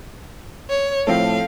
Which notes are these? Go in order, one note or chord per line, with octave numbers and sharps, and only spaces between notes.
C#5
A2 F3 C4 A4 F5